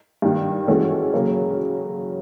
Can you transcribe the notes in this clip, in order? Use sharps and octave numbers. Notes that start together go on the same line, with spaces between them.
G2 D#3 G3
E3 G#3 C#4 F#4 A4
C#3 F#3 A#3 C#4